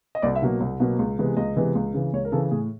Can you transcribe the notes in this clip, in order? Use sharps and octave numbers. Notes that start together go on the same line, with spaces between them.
D#5
C2 D5
E5
B2 F#3 A#3
C2
B2 F#3 A#3
C#2
C3 E3 G#3 B3
C#2 D#5
C3 E3 G#3 B3
C#2
C#3 E3
C#2 C#5
A#4
C#3 E3 A4
A2 G#4